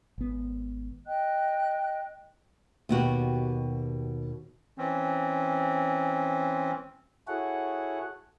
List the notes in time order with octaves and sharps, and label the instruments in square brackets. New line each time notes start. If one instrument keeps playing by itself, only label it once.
[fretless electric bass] G#1 B3
[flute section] D#5 G5 F#6
[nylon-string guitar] D#2 B2 F#4 G4
[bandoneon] E3 C4 C#4
[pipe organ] E4 F#4 G#4 A4 C#5 F#5